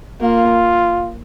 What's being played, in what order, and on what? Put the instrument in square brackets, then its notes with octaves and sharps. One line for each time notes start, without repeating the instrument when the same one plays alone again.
[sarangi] A#3 [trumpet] F4